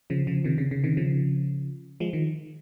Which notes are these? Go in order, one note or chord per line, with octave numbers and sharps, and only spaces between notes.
C#3 F3
C#3 F3
C3 D#3
C#3
C#3
C3 D#3
C#3 F3
F3 G#3
D#3